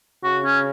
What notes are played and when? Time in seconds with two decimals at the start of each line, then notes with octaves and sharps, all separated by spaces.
0.24 C#3 F#4
0.45 C#4